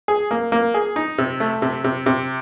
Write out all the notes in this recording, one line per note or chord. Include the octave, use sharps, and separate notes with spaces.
G#4
A#3
A#3
G#4
D#4
C3
A3
C3
C3
C3